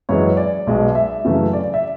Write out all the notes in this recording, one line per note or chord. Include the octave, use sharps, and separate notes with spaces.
F#2 E3 G#3 C#5
D5
B1 B2 G#3
E5
F#2 C#3 E3 A3
D5
D5
E5